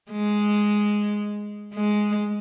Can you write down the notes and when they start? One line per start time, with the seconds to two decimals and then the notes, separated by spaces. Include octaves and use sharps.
0.12 G#3
1.74 G#3